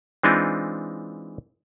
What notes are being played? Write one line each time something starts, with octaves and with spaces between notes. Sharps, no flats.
E3 G#3 C4 D4 D#4 F4